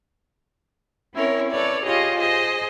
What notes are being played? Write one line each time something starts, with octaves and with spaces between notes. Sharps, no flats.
C4 C#4 E4 A#4 C#5
A4 B4 C#5 D5
F4 G4 G#4 C#5 D#5
G#4 C5 D#5